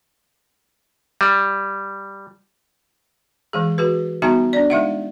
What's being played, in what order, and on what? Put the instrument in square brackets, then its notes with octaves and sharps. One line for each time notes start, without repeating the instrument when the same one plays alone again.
[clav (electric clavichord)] G3
[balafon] E3 G#3 G#4
F#4 G#4 B4
G3 B3 D#4 F#4 A5 A#5
D4 D5
G#3 D#4 E5 F#5